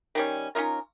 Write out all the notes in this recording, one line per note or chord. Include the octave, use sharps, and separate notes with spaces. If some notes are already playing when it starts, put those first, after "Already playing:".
D#3 G3 C#4
C#4 D#4 F4 A#4